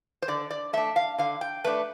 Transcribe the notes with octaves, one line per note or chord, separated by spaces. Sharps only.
C5
D3 D5
D5
A3 D4 E5
F5
D3 F5
G5
A3 D4 B4